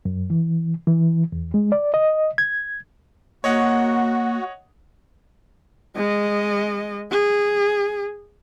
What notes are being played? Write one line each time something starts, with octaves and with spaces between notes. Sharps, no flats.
F#2
E3
E3
E2
G#3
D5
D#5
G#6
A#3 F#4 C#5 D#5 F#5
G#3 D#5
G#4